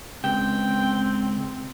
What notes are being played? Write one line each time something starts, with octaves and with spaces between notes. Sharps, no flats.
C#2 C4 G5